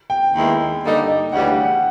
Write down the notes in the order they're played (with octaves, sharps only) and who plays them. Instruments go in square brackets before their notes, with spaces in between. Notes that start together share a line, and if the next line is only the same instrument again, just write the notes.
[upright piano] G5
[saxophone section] D#2 D#3 G#3 B3 E4
G2 D3 G3 A#3 D#4
[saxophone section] D2 C#3 E3 G3 [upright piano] F#5
[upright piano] G5
F#5